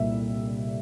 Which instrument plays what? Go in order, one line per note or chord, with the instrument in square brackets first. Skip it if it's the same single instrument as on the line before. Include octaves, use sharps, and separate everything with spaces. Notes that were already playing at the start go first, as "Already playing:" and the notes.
Already playing: [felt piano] C2 A#2 G3 A#3 E5